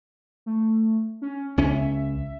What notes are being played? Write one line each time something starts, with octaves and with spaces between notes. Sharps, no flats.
A3
C#4
C#2 C#4 E5